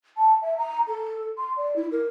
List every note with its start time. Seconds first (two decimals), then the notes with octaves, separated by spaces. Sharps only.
0.17 A5
0.42 E5
0.58 A#5
0.88 A4
1.37 C6
1.57 D5
1.76 E4
1.92 A#4